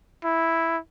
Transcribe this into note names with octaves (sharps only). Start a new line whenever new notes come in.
E4